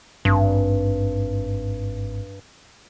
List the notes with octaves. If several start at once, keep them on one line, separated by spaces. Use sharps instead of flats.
G#1 G2